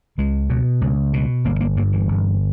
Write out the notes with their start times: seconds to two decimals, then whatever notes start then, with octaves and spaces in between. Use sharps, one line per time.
0.18 C#2 G#3
0.50 B2
0.81 C#2
1.13 B2
1.45 G1 A#3
1.60 A#3
1.76 G2 A#3
1.93 E3
2.08 G1